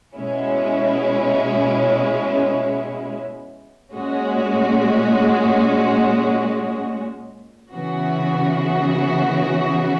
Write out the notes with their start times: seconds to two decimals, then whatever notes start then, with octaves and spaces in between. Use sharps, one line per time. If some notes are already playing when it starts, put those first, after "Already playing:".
0.14 B2 G#3 C#4 E4
3.93 A#2 G#3 C#4 F#4
7.73 C#3 E3 B3 F#4